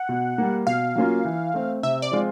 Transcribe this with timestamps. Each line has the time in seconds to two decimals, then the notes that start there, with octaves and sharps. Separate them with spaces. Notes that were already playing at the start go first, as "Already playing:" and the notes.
Already playing: F#5
0.09 B2
0.38 G3 A#3
0.67 B2 F5
0.95 F#3 A#3 C#4 F4
1.25 E3
1.54 A3 C4
1.83 C3 E5
2.02 D5
2.11 F3 G#3 C4 F4